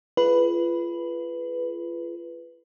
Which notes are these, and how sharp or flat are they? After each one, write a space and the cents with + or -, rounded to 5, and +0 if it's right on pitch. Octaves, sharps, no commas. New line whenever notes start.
F4 -30 G#4 +40 B4 +0